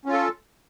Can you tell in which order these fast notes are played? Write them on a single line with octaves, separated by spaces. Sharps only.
C#4 F4 A4